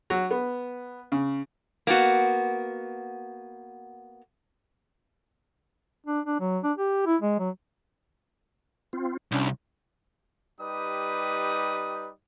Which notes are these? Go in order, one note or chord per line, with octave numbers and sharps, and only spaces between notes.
F#3
B3
C#3
A#3 B3 F#4
D4
D4
F#3
D4
G4
E4
G#3
F#3
C4 F4
C2 C#4 D4
G3 D#4 G4 B4 D#6